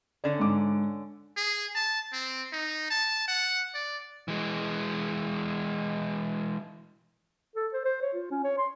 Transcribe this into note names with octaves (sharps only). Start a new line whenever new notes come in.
D3 C#4 D5
G#2 D6
G#4
A5
C4
D#4
A5
F#5
D5
E3 G#3
A4
C5
C5
C#5
F4
C#4
C#5
C6